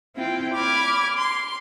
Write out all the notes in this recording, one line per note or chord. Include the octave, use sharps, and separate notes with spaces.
C4 E4 F4 G5
B5 D6 F6 G#6
C6